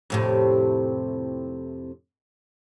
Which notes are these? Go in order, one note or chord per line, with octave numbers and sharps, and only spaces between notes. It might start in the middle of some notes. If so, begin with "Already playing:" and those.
F2 A2 C3